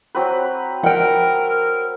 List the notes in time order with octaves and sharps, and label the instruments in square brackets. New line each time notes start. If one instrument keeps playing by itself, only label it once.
[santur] F#3 C4 B4
[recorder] A#4 [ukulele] F#5 G5